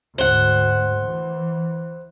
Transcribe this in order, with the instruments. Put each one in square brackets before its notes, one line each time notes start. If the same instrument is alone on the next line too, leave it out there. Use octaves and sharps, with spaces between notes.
[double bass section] D2 G#2 [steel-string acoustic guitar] C5 F#5
[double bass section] E3